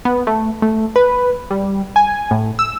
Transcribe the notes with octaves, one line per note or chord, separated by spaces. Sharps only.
B3
A3
A3
B4
G3
G#5
A2
E6